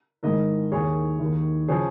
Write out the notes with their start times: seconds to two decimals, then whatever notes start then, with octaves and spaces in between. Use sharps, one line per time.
0.23 G#2 D#3 A#4 D#5
0.72 D#2 D#3 G#4 C#5
1.19 D#2 D#3
1.68 C#3 F3 G#4 C#5